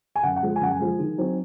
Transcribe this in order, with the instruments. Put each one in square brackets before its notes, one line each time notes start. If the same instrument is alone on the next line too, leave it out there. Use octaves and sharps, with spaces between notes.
[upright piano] G#5
F#2 F#5
F#5
F3 G#3
G#5
F#2 F#5
G#5
F3 G#3
D#3
F#3 C4 D#4